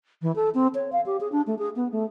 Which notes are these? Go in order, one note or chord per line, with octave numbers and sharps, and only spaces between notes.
E3
A4
C4
C#5
F5
G4
G#4
D4
A3
G#4
B3
A3